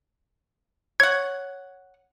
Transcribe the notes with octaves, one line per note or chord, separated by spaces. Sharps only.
C#5 F#5 G#6